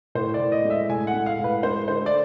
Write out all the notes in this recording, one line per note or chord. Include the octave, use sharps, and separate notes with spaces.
A2 C5
D5
A2
D#5
G#3
E5
A2 G#5
F#5
G#3
F5
A2 B4
G#3 C5
D3 C5
D5